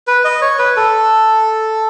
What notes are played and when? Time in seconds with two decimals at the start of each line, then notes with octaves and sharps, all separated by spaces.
0.07 B4
0.24 D#5
0.42 C#5
0.59 B4
0.77 A4